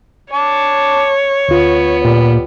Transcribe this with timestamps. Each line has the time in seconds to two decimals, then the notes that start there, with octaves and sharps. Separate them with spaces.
0.33 C#5 A5 D6
1.48 D2 B3 F4
2.05 A#2 G3